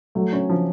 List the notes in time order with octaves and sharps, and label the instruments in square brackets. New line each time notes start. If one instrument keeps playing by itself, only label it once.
[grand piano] F#3 [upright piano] A3
[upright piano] C#4
F3